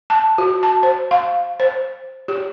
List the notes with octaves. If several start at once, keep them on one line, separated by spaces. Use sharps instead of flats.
A5
F#4
A5
C5
F5
C5
G4